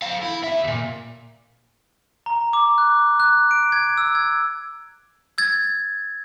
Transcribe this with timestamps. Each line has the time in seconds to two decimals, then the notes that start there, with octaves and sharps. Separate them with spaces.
0.02 A4 F5
0.23 E4
0.42 D#2 E5
0.64 D#2 A#2
2.26 A#5
2.53 D6
2.78 F#6
3.20 F#6
3.51 D7
3.72 G#6
3.98 E6
4.15 G#6
5.38 E6 G#6 A6